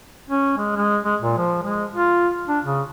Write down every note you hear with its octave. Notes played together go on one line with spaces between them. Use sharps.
C#4
G#3
G#3
G#3
A#2
F3
G#3
F4
D4
C#3